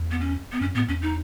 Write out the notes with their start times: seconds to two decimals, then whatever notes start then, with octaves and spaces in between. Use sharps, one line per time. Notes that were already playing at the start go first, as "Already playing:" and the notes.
Already playing: E2
0.11 B3
0.21 C#4
0.52 B3
0.61 F#2 C#4
0.75 A2 B3
0.88 E2 C#4
1.02 D#4